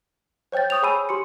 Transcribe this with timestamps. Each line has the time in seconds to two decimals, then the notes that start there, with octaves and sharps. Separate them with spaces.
0.52 C5 C#5 G5 G6 A6
0.70 C#6 D#6 G6 F7
0.82 G#4 C#5 G#5 B5 E6 D#7
1.09 G4 C6 C#7